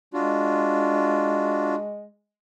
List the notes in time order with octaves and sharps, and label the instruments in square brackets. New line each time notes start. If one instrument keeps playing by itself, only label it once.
[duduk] G#3 [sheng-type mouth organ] D4 F4 F#4